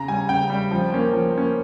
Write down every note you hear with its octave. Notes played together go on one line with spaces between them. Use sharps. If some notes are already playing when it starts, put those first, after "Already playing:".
Already playing: C#3 A#5
G3 C#4 G#5
C#3 G5
G3 C#4
F3
A#3 C#4
F3
A#3 C#4